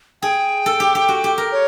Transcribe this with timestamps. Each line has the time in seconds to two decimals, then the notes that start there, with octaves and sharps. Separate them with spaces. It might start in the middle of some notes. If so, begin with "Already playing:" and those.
0.22 G#4 G5
0.66 A4
0.80 G4
0.95 G4
1.09 F#4
1.24 G4
1.38 A#4
1.52 C#5